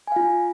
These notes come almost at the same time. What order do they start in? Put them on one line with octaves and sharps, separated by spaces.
G#5 F5 F4